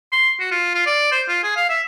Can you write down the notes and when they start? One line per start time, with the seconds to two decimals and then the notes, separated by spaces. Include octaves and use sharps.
0.12 C6
0.40 F#4
0.51 F4
0.75 F4
0.86 D5
1.12 C5
1.28 F4
1.43 G#4
1.56 F5
1.70 E5